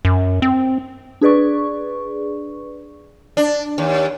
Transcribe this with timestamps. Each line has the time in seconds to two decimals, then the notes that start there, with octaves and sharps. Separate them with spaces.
0.05 F#2
0.42 C4
1.21 D4 G#4 B4 D5 C#6
3.37 D4
3.78 D#2